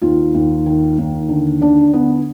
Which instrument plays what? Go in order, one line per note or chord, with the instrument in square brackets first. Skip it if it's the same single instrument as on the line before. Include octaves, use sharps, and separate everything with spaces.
[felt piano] D#2 F4
D#2
D#3
D#2
D3
D3 D4
D3 B3